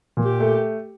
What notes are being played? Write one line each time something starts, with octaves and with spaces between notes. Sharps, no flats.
A#2
G4
A3